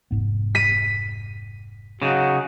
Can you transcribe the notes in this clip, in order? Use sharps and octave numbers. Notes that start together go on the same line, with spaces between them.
F1 G#2 B3
B6 D#7
C#3 F#3 D#4 F#4